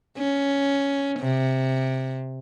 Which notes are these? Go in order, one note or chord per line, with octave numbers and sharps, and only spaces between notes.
C#4
C3